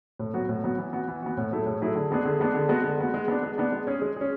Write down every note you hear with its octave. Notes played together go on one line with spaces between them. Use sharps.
A2
F#3 B3 F#4
A2
F#3 B3 F#4
E3
B3 F#4
E3
B3 F#4
A2
F#3 A3 E4 G#4
A2
F#3 A3 E4 G#4
D3
G#3 B3 D4 G#4
D3
G#3 B3 D4 G#4
D3
G#3 B3 F#4
D3
G#3 B3 F#4
G#3
B3 D4
G#3
B3 D4
G#3
C#4 G#4
G#3
C#4 G#4